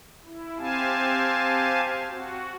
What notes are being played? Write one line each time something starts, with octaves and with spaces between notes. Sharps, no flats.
E4
C4 G4 F5 G#5 A5
F#4